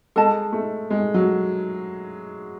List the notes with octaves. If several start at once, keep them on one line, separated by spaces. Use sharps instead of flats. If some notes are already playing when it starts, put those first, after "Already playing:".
G#3 A4 D#5 A5
A3
G#3
F#3